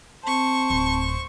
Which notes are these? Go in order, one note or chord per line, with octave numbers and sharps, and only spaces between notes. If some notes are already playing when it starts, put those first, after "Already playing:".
C4 C5 A5 C#6
D1